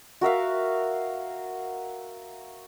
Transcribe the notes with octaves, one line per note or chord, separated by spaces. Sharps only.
F#4 A#4 E5 F5